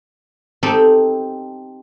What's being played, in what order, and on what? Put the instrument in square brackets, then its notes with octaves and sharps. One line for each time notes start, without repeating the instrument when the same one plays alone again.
[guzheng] C4 D#4 G4 A4